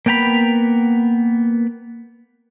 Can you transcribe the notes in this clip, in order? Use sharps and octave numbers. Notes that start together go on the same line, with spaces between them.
A#3 B3 G5 A#5 B5